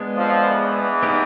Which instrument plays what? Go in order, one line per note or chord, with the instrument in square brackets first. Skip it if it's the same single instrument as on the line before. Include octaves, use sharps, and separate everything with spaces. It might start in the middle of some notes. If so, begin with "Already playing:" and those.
Already playing: [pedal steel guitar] G#3 B3 D4
[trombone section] F2 F3
E2 E3
[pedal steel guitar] B3 D#4 G4